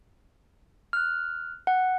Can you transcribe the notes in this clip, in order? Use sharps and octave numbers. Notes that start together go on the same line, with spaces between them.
F6 F#6
F#5